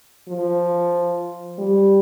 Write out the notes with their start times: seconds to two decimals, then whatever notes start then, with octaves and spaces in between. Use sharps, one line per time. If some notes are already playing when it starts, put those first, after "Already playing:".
0.28 F3
1.58 G3